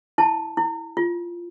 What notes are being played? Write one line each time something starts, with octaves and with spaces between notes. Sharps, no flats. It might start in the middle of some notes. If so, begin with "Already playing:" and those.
E4 A5
E4
F4